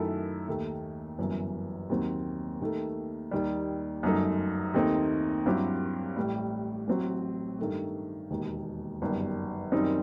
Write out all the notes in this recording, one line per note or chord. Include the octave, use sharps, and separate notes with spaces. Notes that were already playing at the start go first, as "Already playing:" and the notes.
Already playing: F#2 D#3 A3 E4 A4
D#2 D#3 A3
G1 F#2 E3
D#2 D#3 F#3 C4
D#2 D#3 A3
D#2 D#3 G3
G1 F#2 F#3 A3 D#4
D#2 D#3 A3 C4 D#4
G2 F#3 C4 E4 G4
A1 A2 G3
A1 A2 F#3 C4
G2 D#3 A3
E1 D#2 D#3
G1 F#2 D#3 G3
F#2 D#3 G3 C4 D#4